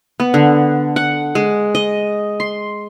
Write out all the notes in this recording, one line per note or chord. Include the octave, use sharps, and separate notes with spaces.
B3
D3
F#5
G#3
D#5
C6